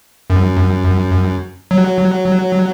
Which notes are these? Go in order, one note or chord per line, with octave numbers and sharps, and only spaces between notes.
F#2
F#3